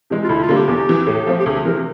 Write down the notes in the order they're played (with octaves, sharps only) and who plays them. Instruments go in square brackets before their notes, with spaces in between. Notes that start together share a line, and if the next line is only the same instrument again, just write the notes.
[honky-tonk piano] C3 E3 G#3
[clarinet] F4
[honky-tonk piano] D2 [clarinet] E4
[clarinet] F4
[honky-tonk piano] D3 G3 A#3
[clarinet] G4
[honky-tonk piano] E2
C3 E3
A2
F3 A3 C4
[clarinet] G4
[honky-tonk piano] D2 [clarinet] G#4
[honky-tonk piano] C3 E3 [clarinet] A#4